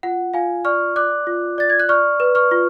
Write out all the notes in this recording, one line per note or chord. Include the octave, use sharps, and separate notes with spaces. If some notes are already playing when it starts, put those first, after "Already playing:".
F4 F#5
F4 F5 G#5
D5 C#6 F6
D5 D6 F#6
F4
D5 A6
G#6
F#6
D5 C#6 F6
B4
C#6 F6
F4